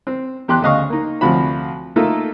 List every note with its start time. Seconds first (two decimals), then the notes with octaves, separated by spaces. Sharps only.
0.07 C4
0.48 E2 G4 C6 F#6
0.62 D2 C#3 D#5 F5 C#6
0.90 A#3 D#4
1.21 D2 C3 F3 F#3 F#4 B5
1.96 A3 A#3 D#4 F4 A4